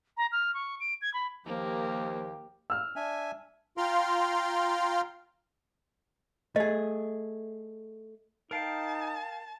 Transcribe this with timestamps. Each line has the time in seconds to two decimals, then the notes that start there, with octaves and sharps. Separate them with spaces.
0.17 A#5
0.32 F6
0.54 C#6
0.80 D7
1.02 G#6
1.14 B5
1.46 D#2 F3 A#3 G4
2.70 E6 F6
2.96 D4 E5 G#5
3.77 F4 F5 G5 A#5 C6 F6
6.56 A3 G#4 D#5
8.51 D#4 A#4 F5 G5 A5